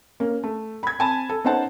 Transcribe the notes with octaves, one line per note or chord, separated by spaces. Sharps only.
A#3 C#4
A3
B5 G#6
C4 G#5 A5 B5
A4
B3 C#4 D#4 C5 F#5 A5